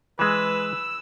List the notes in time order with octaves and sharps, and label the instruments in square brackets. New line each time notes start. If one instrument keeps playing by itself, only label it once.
[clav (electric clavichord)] E3 G#3 [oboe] B4 [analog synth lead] E6